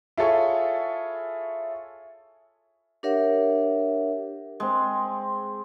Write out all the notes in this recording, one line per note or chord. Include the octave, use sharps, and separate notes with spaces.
E4 F4 G#4 A4 C#5 C#6
D4 G4 A#4 C#5 E5 F#5
G#3 C4